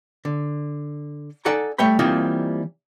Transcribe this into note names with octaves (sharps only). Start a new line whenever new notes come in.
D3
D#4 A4 D5 F#5 G#5 A#5
G3 A3 C#5 E5 G5 B5
E3 G3 A#3 C4 D#4 F4